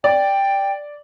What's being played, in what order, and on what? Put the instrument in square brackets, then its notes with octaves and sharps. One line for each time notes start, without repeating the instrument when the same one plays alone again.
[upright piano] D5 [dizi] G5